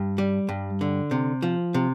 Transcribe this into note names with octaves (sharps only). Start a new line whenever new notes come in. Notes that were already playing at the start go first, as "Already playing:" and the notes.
Already playing: G2
G3
G2
D3
C3
F3
C3